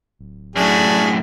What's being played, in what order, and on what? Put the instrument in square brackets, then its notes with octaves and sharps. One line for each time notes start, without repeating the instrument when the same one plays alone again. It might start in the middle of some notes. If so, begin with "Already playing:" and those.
[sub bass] D1
[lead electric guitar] F#2 A2 [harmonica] D4 F#4 G#4